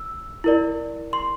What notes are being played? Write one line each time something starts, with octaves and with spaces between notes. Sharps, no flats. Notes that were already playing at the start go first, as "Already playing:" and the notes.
Already playing: E6
E4 A#4 D5
C6